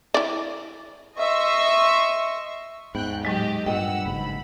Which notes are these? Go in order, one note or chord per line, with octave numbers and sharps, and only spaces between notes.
E4 D5
D#5 E5 C6 C#6
D#2 G#2 B3 G5 F#6
A2 F#3 G#3 G4 D#5
G2 A#2 D#5 F#5 G5 E6
F#1 G#2 B5